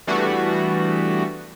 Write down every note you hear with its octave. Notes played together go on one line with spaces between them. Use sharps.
E3 G3 A3 B3 D4 F#4